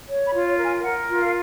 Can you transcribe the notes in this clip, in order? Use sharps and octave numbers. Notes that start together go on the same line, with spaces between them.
C#5
B5
F4
A#4
G#5
A#4 F#5
F4
F5